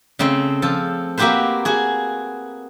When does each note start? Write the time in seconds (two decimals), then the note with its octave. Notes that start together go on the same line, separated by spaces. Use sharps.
0.19 C#3 A3 C4
0.62 F3 A4 C5
1.18 A#3 C4 F#4 G4 B4 C5
1.65 F#4 G#4